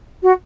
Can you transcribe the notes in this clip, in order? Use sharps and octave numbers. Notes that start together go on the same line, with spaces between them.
F#4